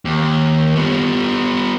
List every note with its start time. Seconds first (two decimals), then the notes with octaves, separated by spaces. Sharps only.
0.05 D#2
0.76 G3 B3